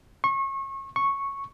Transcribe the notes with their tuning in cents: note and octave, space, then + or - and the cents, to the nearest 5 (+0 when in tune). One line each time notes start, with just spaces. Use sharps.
C#6 -30
C#6 -5